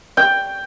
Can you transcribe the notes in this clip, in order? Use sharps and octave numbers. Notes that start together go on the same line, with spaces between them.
G5